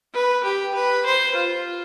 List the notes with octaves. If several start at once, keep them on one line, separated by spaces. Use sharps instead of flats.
B4
G4
B4
C5
F4